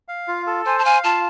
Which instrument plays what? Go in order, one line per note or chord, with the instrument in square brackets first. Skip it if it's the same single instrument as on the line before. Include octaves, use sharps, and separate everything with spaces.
[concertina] F5
F4
A4
[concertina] C5 [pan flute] G#5
[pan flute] A5
[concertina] F5 [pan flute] G#5
[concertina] F4 [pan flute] A5